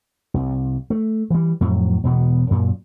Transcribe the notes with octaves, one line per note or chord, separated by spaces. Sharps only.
C2
A3
E3 G3
F2 A2 F#3
E1 B2 B3
F#2 A#2